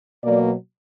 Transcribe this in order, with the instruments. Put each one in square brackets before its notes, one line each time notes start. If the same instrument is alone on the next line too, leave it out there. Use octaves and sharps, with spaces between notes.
[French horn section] B2 F#3 A#3 D5